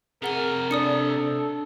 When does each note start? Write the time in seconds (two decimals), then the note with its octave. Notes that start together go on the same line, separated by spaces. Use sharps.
0.22 C3 G#4 A#4 F#5 G#5 G7
0.71 D4 A4 D5 D#6 C#7